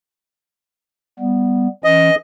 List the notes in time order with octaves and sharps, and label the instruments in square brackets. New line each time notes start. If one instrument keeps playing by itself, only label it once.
[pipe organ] G3 B3
[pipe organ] E3 C#4 [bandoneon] D#5